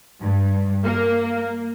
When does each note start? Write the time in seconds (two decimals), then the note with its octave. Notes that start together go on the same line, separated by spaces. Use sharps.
0.21 G2
0.84 A#3